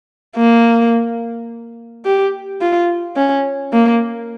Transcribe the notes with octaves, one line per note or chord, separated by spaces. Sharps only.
A#3
G4
F4
C#4
A#3